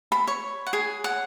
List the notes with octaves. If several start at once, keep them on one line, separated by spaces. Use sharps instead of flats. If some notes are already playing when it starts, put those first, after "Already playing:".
B5
C#5
F#5
G#4 G#5
F#5